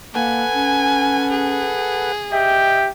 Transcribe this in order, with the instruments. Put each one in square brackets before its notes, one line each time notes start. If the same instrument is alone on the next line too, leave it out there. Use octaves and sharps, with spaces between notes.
[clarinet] A#3 [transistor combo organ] A4 B4 F#5 [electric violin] G#5
[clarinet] C#4
[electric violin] G#4
[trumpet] G4 [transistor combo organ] D#5 G5 [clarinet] E5